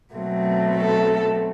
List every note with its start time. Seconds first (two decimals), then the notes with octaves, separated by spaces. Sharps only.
0.15 B2 F#3 A3 C4
0.77 A4